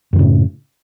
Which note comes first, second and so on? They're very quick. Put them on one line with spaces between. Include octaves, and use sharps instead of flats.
F#2 E3 C#3 A2